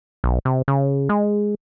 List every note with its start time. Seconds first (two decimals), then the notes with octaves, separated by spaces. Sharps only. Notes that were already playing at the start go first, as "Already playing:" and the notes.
0.24 B1
0.45 C3
0.68 C#3
1.09 G#3